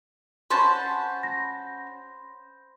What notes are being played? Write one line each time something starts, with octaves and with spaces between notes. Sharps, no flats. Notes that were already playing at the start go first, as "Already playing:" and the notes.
C#4 F#4 C5 A5 B5 C6
A#6